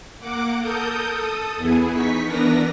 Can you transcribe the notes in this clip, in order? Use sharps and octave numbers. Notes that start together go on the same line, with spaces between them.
A#3 F#5 D6
A4 A#4 D#6 G6
A4 D#6
E2 B3 E4 G#4
D#4 C#6 B6
E3 B3 D4 A#4 B4 A#6